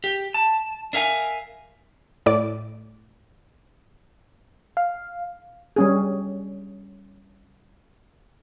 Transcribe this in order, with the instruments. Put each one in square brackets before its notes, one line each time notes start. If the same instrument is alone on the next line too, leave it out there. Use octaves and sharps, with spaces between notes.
[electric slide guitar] G4
A5
D4 A#4 E5 F5 G#5
[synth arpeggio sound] A2 D5 D6
[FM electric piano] F5
[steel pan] G3 C#4 G#4